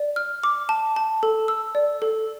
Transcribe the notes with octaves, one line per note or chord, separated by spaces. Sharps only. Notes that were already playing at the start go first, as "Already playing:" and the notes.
Already playing: D5
F6
D6
A5
A5
A4
E6
D5
A4